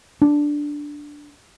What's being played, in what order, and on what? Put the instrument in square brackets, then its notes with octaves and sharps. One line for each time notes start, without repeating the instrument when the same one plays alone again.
[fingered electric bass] D4